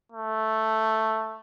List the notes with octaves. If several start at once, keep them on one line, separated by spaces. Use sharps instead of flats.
A3